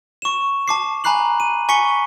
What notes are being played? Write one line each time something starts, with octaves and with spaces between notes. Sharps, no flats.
C#6 E7
A5 D6 C7
G#5 A#5 B5 F#6 C7 F#7
D#7
G#5 C#6 B6 C#7 G7